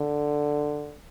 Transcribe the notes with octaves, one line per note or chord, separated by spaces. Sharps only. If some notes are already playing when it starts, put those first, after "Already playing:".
Already playing: D3